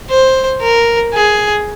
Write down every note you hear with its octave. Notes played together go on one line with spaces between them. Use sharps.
C5
A#4
G#4